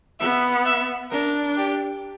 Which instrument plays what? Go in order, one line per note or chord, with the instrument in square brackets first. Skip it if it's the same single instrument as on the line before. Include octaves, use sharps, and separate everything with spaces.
[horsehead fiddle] B3 [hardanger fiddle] E5
[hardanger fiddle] E5
[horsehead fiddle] D4 [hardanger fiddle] A#4
[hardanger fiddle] G4